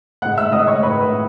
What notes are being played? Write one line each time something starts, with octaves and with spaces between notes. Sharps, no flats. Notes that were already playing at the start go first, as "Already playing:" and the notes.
A2 G#3 F#5 F#6
E5 E6
A2 G#3 D#5 D#6
C#5 C#6
A2 G#3 B4 B5
A2